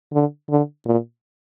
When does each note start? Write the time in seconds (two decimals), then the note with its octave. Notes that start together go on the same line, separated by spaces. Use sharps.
0.13 D3
0.50 D3
0.86 A#2